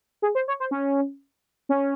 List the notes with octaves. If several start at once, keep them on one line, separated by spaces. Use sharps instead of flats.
G#4
C5
C#5
C5
C#4
C#4